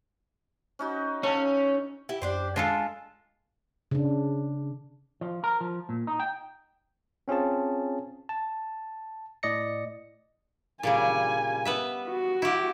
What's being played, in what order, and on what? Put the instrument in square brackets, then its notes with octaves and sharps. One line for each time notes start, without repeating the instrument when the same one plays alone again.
[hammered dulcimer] C#4 D#4 F#4
[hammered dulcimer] C#3 A4 [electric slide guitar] C#4
[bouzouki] E4 G4
[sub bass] F#2 [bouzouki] D4 G4 C5
[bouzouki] G#3 [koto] D4 F4 A4
[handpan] C#3 D4
[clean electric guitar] F3
A#4
F3
A#2
D#4
G5
[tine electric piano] C4 C#4 F4 G#4 A5
A5
A2 D5 D#5 A#6 C#7
[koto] A#2 C#3 G3 [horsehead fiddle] G#5
[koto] B3 B4 E5
[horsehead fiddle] F#4
[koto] E4 G4